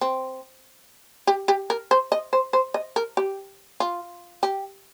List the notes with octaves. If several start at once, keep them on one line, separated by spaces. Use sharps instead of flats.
C4
G4
G4
A#4
C5
D#5
C5
C5
D#5
A#4
G4
F4
G4